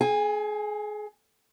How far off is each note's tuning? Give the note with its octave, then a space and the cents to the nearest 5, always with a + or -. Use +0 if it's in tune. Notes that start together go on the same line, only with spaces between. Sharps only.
G#4 +30 G#5 -20